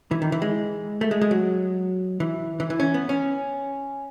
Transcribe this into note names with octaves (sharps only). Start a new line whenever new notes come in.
E3
D#3
E3
G#3
A3
G#3
G#3
F#3
E3
E3
E3
C#4
B3
C#4